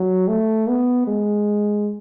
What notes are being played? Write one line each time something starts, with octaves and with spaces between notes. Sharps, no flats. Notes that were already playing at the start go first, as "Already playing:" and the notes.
Already playing: F#3
A3
B3
G#3